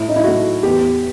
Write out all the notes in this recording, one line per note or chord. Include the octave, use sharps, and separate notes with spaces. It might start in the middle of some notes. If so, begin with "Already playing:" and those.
Already playing: A2 E4
D#4
E4
F#3 A3 F#4
E2 G4